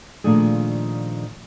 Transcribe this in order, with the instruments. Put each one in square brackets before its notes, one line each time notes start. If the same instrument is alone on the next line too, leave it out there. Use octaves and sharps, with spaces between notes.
[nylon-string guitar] A#2 D#3 F3 A3 D4 G#4